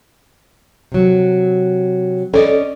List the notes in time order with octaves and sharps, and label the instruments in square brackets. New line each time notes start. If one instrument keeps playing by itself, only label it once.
[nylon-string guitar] C3 F#3
[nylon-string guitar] C#4 D5 D#5 [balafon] A4